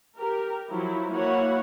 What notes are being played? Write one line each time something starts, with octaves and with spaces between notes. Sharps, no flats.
G4 A#4
F3 F#3 E4
A#3 E4 F#4 C#5 F#5